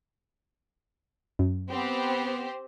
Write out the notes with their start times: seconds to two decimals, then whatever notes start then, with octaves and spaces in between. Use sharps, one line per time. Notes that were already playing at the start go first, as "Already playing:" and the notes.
1.39 F#2
1.69 B3 C4 G4 C5